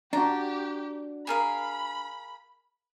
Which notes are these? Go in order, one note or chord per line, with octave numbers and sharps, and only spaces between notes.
D4 F#4 G4 A#5
G#4 A#4 F5 B5